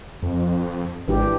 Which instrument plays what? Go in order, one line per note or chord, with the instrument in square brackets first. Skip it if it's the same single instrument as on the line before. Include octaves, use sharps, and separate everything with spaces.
[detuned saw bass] F2
[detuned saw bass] G#1 [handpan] E3 D4 G4